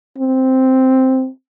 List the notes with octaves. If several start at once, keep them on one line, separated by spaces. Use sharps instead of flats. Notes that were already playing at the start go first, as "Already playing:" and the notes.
C4